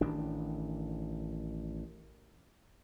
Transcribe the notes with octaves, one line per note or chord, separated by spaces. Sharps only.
A1 D#3 D4